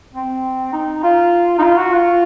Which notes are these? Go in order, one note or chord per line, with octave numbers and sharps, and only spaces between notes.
C4
D#4
F4
D#4
F4
F#4
F4